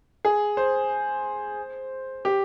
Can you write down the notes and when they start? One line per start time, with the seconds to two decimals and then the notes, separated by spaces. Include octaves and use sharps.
0.25 G#4
0.57 C5
2.25 G4